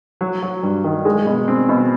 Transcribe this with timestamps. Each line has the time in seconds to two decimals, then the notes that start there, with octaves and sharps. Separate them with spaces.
0.21 F#3
0.42 F#3
0.63 G2
0.84 D#3
1.05 G#3
1.26 B2
1.48 C4
1.69 B2